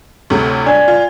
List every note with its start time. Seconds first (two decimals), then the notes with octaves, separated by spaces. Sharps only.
0.30 D2 A2 C3
0.66 D4 D5 G#5 G#6
0.88 F4